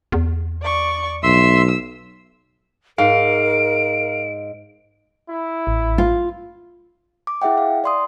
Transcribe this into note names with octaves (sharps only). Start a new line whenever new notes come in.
E2
D5 C#6
B1 E5 C6 E6
G#2 A#4 F5 D7
E4
A1
F4
D6
E4 G#4 E5 F#5 G5
F5
D5 C6 D#6